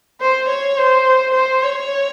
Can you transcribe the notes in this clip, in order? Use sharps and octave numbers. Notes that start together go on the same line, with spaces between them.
C5
C#5
C5
C5
C#5